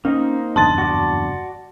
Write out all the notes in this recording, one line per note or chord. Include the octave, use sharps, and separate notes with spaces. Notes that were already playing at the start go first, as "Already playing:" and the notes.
A#3 C4 C#4 D#4
F#1 E2 G2 A5 C6 A6
F#4 D5